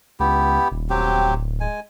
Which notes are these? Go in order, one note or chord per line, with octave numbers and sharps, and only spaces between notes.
C#2 B3 E4 G4
D#1
F#3 C4 G4
D1
G#3 G#5